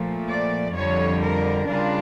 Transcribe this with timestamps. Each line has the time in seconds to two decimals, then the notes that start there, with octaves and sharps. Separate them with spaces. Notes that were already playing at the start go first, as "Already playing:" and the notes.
Already playing: A#2 F3 A3
0.28 D5
0.75 F2 D3 G3 C#5
1.22 A#4
1.68 C#3 G3 D4 F4 A#4